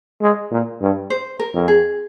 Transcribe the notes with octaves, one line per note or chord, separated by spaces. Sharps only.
G#3
A#2
G2
C5
A#4
F2
G#4